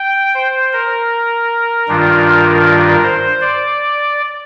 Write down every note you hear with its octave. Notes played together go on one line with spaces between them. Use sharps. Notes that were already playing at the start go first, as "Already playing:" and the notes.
Already playing: G5
C5
A#4
G2 D#3 G3 D4 F4
A#4
C5
D5